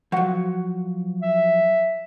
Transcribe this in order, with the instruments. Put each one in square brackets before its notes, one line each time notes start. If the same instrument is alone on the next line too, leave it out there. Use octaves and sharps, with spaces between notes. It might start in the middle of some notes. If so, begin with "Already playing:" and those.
[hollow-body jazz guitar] F3 F#3 [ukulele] F#4 F#5
[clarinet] E5